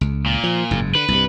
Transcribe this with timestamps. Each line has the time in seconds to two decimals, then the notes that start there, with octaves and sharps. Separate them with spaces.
0.01 C#2
0.26 A#2
0.44 F3
0.71 F#1 G#2
0.95 D3 B4
1.08 C2 G2